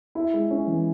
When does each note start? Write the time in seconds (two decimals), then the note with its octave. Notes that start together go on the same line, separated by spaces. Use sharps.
0.15 E4
0.33 G#3
0.50 C#4
0.67 E3